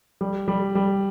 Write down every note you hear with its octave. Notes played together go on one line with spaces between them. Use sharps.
G3
G3
G3